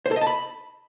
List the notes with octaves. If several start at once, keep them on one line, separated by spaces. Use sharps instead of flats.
C5
A4
D#5
A5
B5